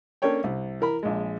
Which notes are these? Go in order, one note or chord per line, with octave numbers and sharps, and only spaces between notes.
A#3 C#4 D4 A4 C#5 G5
C2
E3 A#4 B5
A#1 G#3